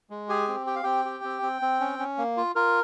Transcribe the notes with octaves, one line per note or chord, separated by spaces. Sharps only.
G#3
G4 G#4 G#5
C4
G4 G5
F5
C4 G4 G5
G4
C4
C4
C4
C#4
C#4
A#3
F4
F4 A#4